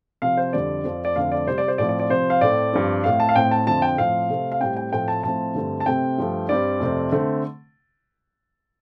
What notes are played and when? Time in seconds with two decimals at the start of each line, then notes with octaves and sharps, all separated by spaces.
0.22 C3 F3 C4 F5
0.37 C5
0.53 F2 D3 G3 C4 D5
0.84 F2 F3 C4
1.05 D5
1.16 F2 D3 A3 C4 F5
1.32 D5
1.47 C3 G3 C4 C5
1.58 D5
1.68 C5
1.78 A2 F3 C4 D5
1.89 D5
2.00 D5
2.09 C3 F3 C4 C5
2.30 F5
2.41 A2 A3 C4 D5
2.73 G2 F3 C4
3.04 A2 A3 C4 F5
3.20 A5
3.29 F5
3.35 A2 A3 C4 G5
3.51 A5
3.66 F2 D3 F3 C4 A5
3.82 G5
3.98 A2 F3 C4 F5
4.30 C3 A3 C4
4.52 F5
4.61 A2 G3 C4 G5
4.76 G5
4.92 A2 F3 A3 C4 G5
5.08 A5
5.23 A2 F3 A3 C4 A5
5.55 G2 D3 A3 C4
5.80 A5
5.86 C3 A3 C4 G5
6.18 G2 F3 A3
6.49 G2 G3 C4 D5
6.80 F2 C3 A3 C4
7.12 D3 A3 C4